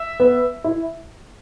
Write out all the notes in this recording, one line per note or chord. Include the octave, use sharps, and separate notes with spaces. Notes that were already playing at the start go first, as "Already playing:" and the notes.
Already playing: E5
B3
E4